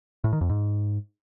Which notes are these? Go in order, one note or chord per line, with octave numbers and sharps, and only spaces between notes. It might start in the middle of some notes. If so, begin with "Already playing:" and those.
A2
D#3
F2
G#2